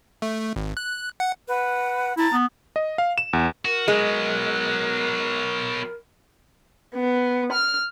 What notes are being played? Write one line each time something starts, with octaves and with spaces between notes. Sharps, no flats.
A3
G#1
F#6
F#5
B4 F#5
E4 A5 A#5
B3
D#5
F5
E7
E2
F#4 A#4
F#3 G#3 B3
B3
F6